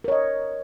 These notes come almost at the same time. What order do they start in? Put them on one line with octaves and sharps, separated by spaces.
A#4 C#5 D#5